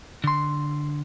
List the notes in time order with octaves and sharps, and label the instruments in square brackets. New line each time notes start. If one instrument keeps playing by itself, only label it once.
[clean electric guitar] D3 C6